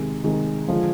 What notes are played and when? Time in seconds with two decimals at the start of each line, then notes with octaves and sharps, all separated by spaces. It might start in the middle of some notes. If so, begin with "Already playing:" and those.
Already playing: C3 D#3 G#3
0.24 C3 D#3 G#3
0.68 D3 F3 G#3